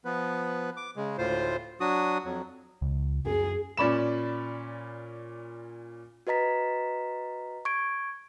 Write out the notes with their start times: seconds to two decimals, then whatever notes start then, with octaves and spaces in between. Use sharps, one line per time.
0.05 F3 B3 B4
0.77 D6
0.96 C#3 G#3
1.18 D2 A2 F4 C5
1.80 F#3 D4 F#4 D#6
2.24 F2 F#3
2.81 C#2
3.26 F#2 G#4
3.77 A#2 C#4 D5 B5 E7
6.27 F#4 B4 D#5 A#5 B6
7.65 C#6 G#6 D7